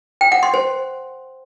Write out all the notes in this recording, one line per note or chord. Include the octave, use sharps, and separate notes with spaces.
G5
F#5
C6
C5